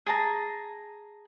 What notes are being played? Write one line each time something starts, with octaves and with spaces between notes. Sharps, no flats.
G#4 A5 A#5